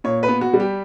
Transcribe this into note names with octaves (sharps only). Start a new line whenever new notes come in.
A#2 C#5
B4
B3
F#4
G3
G4